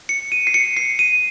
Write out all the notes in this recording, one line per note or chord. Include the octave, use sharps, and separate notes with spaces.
C#7
D#7
C7
C#7
C7
D#7